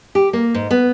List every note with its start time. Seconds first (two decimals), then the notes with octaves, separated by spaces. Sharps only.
0.15 G4
0.33 A#3
0.55 G#2
0.71 B3